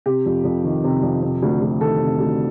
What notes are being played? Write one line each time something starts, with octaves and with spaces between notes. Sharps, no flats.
C3 G4
F2
F2
D#3
C3
F2
C3
D2
D2
D#3 A4
C3
D2